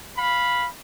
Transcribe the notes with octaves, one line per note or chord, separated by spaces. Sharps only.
F5 B5